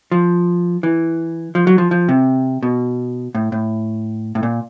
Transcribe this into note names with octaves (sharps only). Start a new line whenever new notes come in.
F3
E3
F3
F#3
F3
F3
C3
B2
A2
A2
A2
A#2